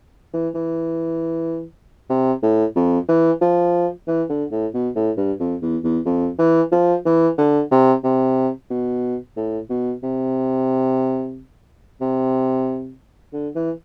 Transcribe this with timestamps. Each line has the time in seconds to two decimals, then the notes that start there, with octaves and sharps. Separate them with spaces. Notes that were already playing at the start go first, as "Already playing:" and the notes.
0.33 E3
0.55 E3
2.10 C3
2.42 A2
2.76 F2
3.09 E3
3.41 F3
4.08 E3
4.29 D3
4.52 A2
4.74 B2
4.96 A2
5.17 G2
5.40 F2
5.62 E2
5.84 E2
6.06 F2
6.39 E3
6.72 F3
7.06 E3
7.38 D3
7.71 C3
8.04 C3
8.70 B2
9.37 A2
9.70 B2
10.03 C3
12.01 C3
13.33 D3
13.55 E3